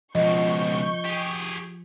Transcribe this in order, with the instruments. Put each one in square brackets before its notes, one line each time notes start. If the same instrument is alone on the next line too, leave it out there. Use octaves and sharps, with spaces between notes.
[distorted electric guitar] C#2 B2 [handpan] F3 [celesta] D#5 [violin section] C#6 G6
[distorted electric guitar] G4 G#4